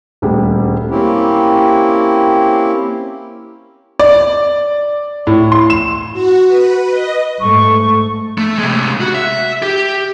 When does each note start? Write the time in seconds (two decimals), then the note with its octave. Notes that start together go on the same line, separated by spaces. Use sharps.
0.22 D#1 D2 G3 G#4
0.90 A#3 C4 C#4 E4 G4
3.99 D5
5.27 A2
5.52 C6
5.70 E7
6.13 F#4
6.47 B4
6.91 D#5
7.41 G#2 A3 C#6
8.38 A3
8.58 C3 G#3
9.01 F#4
9.15 E5
9.62 G4